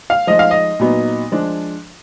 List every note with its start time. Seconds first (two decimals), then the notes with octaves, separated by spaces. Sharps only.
0.10 F5
0.27 F3 G#3 D#4 D#5
0.39 F5
0.51 D#5
0.79 A#2 F#3 B3 D#4
1.32 F3 G#3 D4